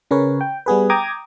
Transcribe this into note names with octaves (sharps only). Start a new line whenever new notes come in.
C#3 C#4 A#4 B4 C#5
G5
G3 B3 G#4 B4
G5 A#5 D6 D#6 G#6